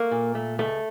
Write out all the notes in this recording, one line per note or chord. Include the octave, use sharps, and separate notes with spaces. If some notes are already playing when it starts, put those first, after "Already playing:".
Already playing: A3 A#3
A#2
A3
C#2 A3